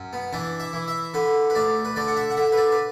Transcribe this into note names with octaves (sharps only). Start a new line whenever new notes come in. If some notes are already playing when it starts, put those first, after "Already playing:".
Already playing: F#2
B3
E3 D4
E5
E3
E5
D3 B4
B4
D2 D5
B4
D3 D5
F#5
E5
F#5
D3 E5
B4
D5
B4